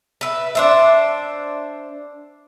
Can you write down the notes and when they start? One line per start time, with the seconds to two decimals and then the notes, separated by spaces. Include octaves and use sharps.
0.21 B4 E5
0.55 D4 C5 E5